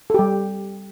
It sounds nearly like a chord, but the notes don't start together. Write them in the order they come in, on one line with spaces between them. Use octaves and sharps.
A4 G4 G3